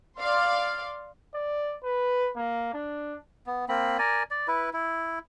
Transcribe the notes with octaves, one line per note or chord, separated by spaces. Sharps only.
D5 F5 C6
D5
B4
A#3
D4
B3
A#3 C4 B5
A#4 D5 G#5
D5
E4 B4
E4